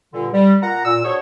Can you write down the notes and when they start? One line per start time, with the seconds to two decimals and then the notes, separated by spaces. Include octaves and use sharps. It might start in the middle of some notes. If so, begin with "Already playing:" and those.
0.14 G2 A#2 D3
0.33 G3
0.63 A#2 F#5 A#5
0.85 A#2 E6
1.05 D4 F#4 G#4 C5 C#5